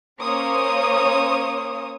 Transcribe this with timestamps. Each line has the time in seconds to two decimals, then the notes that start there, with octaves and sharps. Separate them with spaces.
0.21 A#3 C#4 C5 C#5 D#6